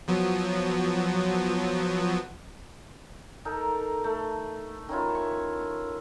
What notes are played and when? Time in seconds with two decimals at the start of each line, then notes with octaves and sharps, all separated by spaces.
0.08 F3 F#3 B3
3.45 D#4 A4 A#4
4.04 A3
4.89 D#3 C#4 E4 F4
5.15 C#6